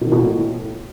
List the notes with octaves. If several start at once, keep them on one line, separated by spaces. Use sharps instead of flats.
B2
D#3
B2
A#2
A2